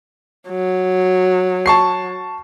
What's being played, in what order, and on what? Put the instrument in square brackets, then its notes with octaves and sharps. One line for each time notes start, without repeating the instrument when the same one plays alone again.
[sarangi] F#3
[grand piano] A5 C#6 C7